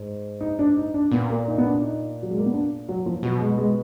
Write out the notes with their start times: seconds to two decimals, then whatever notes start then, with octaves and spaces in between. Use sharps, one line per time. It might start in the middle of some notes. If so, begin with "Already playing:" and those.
Already playing: G#2
0.41 D#4
0.59 D4
0.77 D#4
0.94 D4
1.11 A#2 B3
1.30 A#3
1.48 D#4
1.58 B3
1.65 D4
1.82 D#4
2.23 F#3
2.31 G#3
2.38 A#3
2.46 B3
2.53 D4
2.89 F#3
3.06 F3
3.23 B2 F#3
3.40 G#3
3.58 G#3